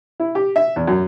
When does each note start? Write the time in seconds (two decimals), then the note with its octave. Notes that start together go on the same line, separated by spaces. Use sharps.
0.20 E4
0.35 G4
0.56 E5
0.76 E2
0.87 F#2